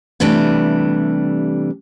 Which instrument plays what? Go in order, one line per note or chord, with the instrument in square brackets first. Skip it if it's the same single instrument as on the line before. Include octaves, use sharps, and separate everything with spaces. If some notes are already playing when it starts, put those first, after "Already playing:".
[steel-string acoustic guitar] C3 E3 G3 A3 D4